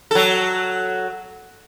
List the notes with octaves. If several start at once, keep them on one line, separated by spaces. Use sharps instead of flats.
F#3 A4